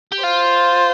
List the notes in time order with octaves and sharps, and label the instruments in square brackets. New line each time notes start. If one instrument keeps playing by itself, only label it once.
[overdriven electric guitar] G4
[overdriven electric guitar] F4 [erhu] C5